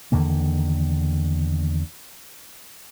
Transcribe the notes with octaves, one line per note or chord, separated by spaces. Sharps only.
E2 D3 D#3 A#3